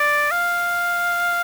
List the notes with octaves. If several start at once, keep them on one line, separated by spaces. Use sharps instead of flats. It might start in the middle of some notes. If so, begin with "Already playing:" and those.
Already playing: D5
F5